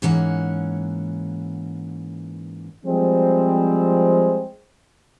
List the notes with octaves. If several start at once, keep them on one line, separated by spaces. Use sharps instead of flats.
G#2 E3 A#3 C#4 F#5
F3 G3 G#3 C4